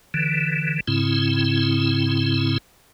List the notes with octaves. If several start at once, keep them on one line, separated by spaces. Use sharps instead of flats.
D3 E3
G#2 C#3 C4 E4